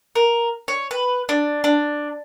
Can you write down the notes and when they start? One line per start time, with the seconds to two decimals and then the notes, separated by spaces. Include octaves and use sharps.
0.15 A#4
0.68 C#5
0.91 B4
1.29 D4
1.64 D4